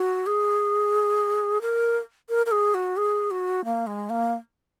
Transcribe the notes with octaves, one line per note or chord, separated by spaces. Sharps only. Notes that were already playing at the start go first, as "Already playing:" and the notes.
Already playing: F#4
G#4
A#4
A#4
A#4
G#4
F#4
G#4
F#4
A#3
G#3
A#3